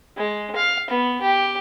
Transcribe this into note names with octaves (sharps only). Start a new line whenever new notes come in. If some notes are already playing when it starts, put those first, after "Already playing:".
G#3
F5
B3
G4